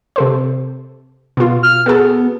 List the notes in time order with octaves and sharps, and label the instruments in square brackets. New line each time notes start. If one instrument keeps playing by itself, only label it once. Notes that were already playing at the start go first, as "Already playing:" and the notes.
[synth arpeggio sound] C3 A4 C5
B2 F4
[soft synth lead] F6
[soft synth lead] B3 [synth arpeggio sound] F#4 G#4 A4